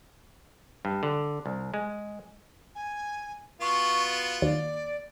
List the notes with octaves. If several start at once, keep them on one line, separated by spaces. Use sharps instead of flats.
G2
D3
C2
G#3
G#5
B3 F4 F#4 C#6
D#2 D5